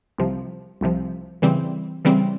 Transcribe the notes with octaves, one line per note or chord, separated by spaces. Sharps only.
C2 C3 F3
C2 C3 F3
C#3 E3 G3 C4
C#3 E3 G3 C4